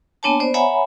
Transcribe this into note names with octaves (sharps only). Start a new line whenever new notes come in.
A#3 B3 D4 C#5 G#5 A5
B3 C5 D5
C#5 E5 F#5 G#5 A#5 B5